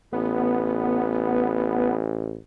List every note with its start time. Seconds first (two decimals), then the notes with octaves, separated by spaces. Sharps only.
0.13 A1 B3